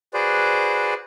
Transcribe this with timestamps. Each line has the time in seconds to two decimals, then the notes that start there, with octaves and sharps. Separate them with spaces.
0.14 F#4 G#4 B4 C5 D5